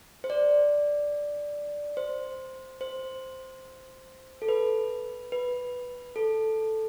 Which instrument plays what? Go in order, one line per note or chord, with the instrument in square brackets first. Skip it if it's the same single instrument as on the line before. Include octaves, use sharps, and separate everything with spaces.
[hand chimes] C5
D5
C5
C5
A4
B4
B4
A4